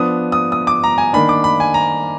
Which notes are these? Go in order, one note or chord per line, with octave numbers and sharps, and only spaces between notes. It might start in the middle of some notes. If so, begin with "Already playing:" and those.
Already playing: F3 B3 D4 D#6
D#6
D#6
D6
A#5
G#5
D#3 A#3 D4 B5
D6
B5
G#5
A#5